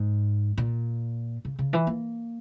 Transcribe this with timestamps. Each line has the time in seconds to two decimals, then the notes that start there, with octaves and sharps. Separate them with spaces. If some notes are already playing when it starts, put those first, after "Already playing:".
Already playing: G#2
0.57 A#2
1.45 C#3
1.59 C#3
1.73 E3
1.87 A#3